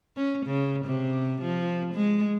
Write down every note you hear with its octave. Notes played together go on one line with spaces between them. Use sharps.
C#4
C#3
C3
F3
G#3